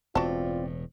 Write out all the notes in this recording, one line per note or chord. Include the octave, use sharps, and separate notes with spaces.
E1 A2 C4 F4 F#4 D5 A5